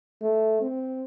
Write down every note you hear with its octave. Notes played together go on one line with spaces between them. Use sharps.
A3
C4